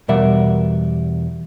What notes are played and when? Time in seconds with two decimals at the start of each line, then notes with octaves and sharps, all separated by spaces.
0.08 E2 B2 G3 A#4 E5 F#5